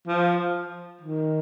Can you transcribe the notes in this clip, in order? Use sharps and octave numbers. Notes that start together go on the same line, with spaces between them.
F3
D#3